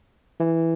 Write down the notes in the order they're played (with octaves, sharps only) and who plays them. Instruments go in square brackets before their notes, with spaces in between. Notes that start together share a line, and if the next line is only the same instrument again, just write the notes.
[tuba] E3